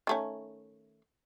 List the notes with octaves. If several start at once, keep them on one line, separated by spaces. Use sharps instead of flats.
D#3 A3 C#4